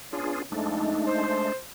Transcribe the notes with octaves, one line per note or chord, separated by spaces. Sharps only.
B3 C#4 D4 F4 G#4
F2 G#3 A3 D4 D#4
C5